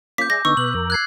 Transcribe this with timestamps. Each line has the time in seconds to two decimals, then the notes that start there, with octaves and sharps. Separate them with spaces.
0.18 A#3 C#4 F4 D6 G6 B6
0.30 G#4 D5 E5 A#6
0.45 D3 B3 D#4 C#6 E6
0.57 B2 B4 F#6 F#7
0.74 F2 A#4
0.90 F#6 G#6 C7